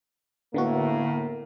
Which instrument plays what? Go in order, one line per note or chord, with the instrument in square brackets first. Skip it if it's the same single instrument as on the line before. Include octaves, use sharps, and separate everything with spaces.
[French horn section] A2 A#3 [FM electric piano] D3 B3 F#4